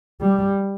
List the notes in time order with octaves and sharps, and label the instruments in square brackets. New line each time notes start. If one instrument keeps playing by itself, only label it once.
[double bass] G3